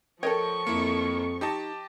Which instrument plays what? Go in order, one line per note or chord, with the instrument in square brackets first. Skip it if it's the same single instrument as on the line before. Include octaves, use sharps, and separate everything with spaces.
[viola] F3 C#6 [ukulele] A4 A#4 C#5 [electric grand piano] D#5 G5
[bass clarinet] F2 [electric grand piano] A#3 E4
[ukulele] D#4 [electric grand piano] G4 D#5 A5